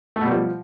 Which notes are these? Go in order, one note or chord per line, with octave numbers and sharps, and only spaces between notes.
A3
B2
G3
F3